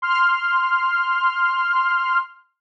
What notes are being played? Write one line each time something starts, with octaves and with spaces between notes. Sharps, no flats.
C6 F6